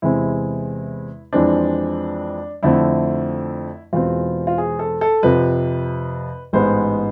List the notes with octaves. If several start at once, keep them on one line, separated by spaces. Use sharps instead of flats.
E2 C3 G#3 C4 E4
F2 E3 G#3 C4 D4
F2 D3 A3 C4 E4
E2 B2 G#3 C4 F4
F4
G#4
A4
A4
F2 C3 F3 B4
A1 G#2 G#3 B3 C5